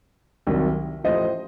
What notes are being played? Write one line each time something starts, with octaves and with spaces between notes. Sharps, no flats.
C2 C3 D#3 F#3
A1 A2 F3 C5 D#5